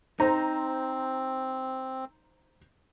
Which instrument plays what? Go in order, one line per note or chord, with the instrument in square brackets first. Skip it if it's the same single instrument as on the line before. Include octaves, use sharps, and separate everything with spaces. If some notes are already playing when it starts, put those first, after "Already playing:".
[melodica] C4 [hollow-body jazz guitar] D#4 [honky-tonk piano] C5 A#5